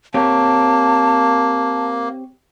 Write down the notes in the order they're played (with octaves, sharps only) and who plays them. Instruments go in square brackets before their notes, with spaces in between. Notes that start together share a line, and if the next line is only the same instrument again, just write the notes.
[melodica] A#3 [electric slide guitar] C4 G4 C#5 [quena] A5